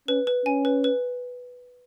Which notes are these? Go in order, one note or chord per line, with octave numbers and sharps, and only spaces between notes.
C#4 B4
B4
C#4 G#5
B4
B4